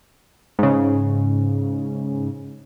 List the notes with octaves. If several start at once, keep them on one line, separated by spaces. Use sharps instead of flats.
G#2 C#3